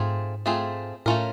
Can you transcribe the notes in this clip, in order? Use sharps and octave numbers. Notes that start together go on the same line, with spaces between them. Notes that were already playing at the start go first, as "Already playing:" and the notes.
Already playing: G#2 A3 C4 F4 G#4
A3 C4 F4 G#4
A2 A3 C#4 F4 A#4